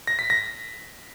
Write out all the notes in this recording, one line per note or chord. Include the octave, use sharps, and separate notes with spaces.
A#6
B6
A#6